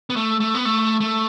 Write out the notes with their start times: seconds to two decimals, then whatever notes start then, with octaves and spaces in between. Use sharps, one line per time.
0.10 B3
0.16 A3
0.40 A3
0.55 B3
0.65 A3
1.00 A3